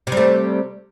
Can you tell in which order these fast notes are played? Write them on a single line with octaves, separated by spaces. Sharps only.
C3 G3 A3